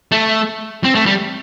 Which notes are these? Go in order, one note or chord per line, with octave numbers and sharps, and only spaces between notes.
A3
C4
A3
G3